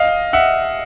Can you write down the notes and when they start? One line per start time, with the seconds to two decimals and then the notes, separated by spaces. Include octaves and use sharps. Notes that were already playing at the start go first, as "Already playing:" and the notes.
Already playing: D#5 F5
0.33 E5 F#5